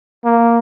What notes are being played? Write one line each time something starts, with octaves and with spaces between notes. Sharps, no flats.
A#3